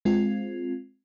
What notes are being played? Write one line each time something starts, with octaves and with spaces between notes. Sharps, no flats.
G#3 C4 F4